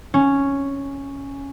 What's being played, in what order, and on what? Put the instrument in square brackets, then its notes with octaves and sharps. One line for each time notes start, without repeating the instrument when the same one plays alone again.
[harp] C#4